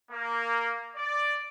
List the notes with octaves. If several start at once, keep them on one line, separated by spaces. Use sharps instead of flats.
A#3
D5